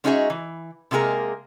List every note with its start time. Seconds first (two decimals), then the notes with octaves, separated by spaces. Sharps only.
0.04 G#3 C#4 D#4 F#4 G#4 E5
0.30 E3
0.91 C3 G#3 A#3 G#4 A#4